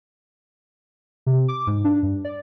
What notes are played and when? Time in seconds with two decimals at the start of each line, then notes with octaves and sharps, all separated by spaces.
1.26 C3
1.48 D6
1.67 G#2
1.84 D4
2.03 G2
2.25 D5